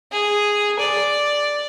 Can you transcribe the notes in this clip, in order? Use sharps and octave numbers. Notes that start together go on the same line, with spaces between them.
G#4
D5